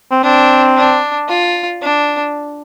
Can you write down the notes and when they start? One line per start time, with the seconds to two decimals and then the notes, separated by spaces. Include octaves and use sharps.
0.11 C4
0.23 C4 D4
0.77 D4
1.29 F4
1.82 D4